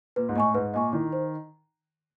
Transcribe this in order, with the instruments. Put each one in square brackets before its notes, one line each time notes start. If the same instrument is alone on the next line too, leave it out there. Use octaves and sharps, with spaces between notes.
[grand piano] A#2 [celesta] B4
[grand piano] G#2
[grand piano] A2 [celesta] D#5 G#5 C#6
[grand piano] G#2 [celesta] B4
[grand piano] A#2 [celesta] D#5 G#5 C#6
[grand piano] D#3 [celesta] E4
[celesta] C5